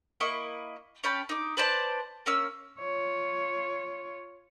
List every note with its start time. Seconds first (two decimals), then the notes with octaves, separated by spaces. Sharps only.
0.20 A#3 E4 D#5 C#6
1.04 C#4 G5 A5 B5
1.29 D#4 D6
1.57 B4 C5 D5 A5
2.26 A#3 C#4 E6
2.79 F4 C#5